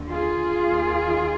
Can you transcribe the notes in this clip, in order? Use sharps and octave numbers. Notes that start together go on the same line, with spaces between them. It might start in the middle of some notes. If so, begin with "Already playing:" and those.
Already playing: D#2 D3
F4 G#4
D#2 D#3